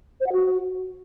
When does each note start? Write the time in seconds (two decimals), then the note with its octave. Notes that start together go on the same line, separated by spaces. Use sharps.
0.20 C5
0.26 F#5
0.32 F#4